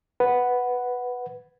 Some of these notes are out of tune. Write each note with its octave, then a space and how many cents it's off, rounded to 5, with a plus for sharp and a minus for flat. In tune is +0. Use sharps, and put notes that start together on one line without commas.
B4 +0 F#5 +0